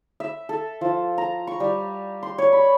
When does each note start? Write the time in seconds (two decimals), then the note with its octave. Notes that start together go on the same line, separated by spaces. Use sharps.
0.20 E5
0.49 A4
0.81 F3
1.18 A#5
1.47 C#6
1.60 G3
2.23 C6
2.38 C#5
2.53 B5